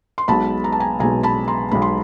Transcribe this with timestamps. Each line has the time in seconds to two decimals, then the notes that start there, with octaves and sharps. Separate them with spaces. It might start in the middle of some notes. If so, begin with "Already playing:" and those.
0.18 C6
0.28 B1 B2 G#3 A5 B5
0.64 A#5
0.72 A5
0.80 G#5 A#5
0.99 B1 B2 G#3 G#5 A#5
1.23 A5 B5
1.48 A#5 C6
1.71 B1 B2 G#3 B5
1.82 C6